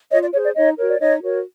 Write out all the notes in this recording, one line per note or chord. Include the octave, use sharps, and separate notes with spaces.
F4 C#5 D#5
D5
G#4 C5 C#5
D5
D#4 C#5 D#5
F#4 A#4 C#5
D5
D#4 C#5 D#5
F#4 A#4 C#5